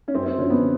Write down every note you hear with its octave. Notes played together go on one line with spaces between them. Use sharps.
C#4
F#2 C4
C4
D3 F3 C#4
B3